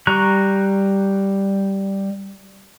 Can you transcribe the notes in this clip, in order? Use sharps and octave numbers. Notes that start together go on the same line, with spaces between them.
G3 A#5 C#6 F#6